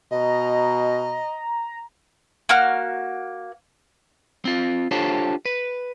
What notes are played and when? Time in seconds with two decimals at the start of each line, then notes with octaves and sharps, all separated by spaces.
0.12 B2 D#5 A#5
2.49 A#3 F#4 F6
4.45 C4 F4
4.91 D4 F4 G4 A4 C5 C#5
5.45 B4